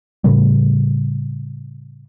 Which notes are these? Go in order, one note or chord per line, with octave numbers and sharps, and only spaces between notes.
A2 C#3 G3